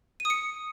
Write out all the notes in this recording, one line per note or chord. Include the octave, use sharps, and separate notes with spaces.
D#7
D#6
C#7